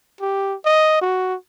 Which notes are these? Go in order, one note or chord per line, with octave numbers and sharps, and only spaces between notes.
G4
D#5
F#4